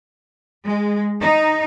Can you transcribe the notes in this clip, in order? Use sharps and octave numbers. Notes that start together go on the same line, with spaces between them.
G#3
D#4